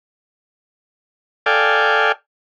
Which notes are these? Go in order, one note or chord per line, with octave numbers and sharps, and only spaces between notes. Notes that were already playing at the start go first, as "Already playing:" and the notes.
A4 D5 F5 G5 G#5